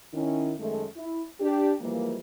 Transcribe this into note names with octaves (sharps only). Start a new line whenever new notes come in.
D#3 C#4 E4
F#2 D#3 G#3 A3
E4
D4 G4
E3 F3 G3 G#3 A#3